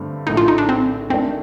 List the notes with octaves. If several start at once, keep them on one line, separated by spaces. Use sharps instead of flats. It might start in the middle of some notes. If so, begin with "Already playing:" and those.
Already playing: G2 D3 A3 C4
A#1 A2 A3 D#4
F4
D#4
D4
C4
F2 D#3 A3 C4 D4